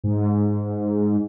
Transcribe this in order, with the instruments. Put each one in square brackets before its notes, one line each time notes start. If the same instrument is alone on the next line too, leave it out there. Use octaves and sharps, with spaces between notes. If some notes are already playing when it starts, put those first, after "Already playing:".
[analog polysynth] G#2